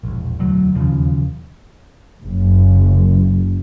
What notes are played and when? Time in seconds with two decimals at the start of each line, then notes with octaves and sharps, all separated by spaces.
0.03 E1 A#1
0.39 E1 D2 F#3
0.74 E1 D#2 C#3 F3
2.22 F#1